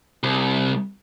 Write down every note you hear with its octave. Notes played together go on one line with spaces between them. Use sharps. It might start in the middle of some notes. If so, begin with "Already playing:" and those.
C2